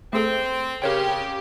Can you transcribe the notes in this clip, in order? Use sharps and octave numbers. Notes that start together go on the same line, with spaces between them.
A3 C4 G#4 A4
C#3 G4 A#4 C#5 G5